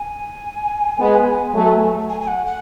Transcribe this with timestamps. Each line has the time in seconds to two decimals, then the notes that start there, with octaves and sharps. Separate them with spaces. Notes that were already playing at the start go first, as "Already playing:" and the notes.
Already playing: G#5
0.99 G#3 B3
1.54 F#3 A3
2.10 G#5
2.21 G#5
2.27 F#5
2.46 F#5